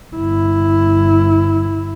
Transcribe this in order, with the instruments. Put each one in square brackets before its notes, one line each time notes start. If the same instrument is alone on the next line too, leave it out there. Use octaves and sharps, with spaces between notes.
[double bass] G1 E4